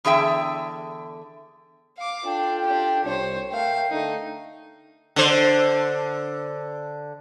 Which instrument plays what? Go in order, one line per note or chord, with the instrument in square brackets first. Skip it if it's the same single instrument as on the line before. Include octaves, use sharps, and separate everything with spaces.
[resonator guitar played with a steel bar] E2 D3 G#4 E5 G5
[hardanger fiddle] F5 D6
[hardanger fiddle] D4 [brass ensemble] F4 A4 G5
[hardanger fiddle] D4 G4
[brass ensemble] C2 [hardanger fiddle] C5 C#5
[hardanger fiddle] A3 F5 [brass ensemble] A#4 G5
[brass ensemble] D3 A3 [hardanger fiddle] D#4
[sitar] D3 C5